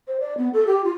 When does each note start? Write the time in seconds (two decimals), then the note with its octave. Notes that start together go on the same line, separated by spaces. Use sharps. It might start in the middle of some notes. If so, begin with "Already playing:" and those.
0.08 C5
0.20 D5
0.38 B3
0.53 A4
0.67 G4
0.84 F4